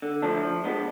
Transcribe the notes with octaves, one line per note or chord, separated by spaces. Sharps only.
D3
F3 A3 D4
F3
G#3 B3 D4